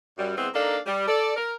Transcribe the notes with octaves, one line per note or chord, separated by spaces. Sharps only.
F#2 G3
E2 G#3 B3 C4
A#3 D4 D#4 A4 D5 F5
G3
A4 D5
A#4